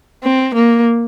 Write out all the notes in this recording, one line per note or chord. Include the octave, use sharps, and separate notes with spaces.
C4
A#3